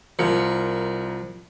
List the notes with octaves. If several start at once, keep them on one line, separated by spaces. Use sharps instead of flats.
C2 F3 A#4 C#7